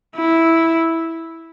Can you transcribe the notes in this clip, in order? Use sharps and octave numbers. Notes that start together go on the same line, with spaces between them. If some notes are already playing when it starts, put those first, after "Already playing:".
E4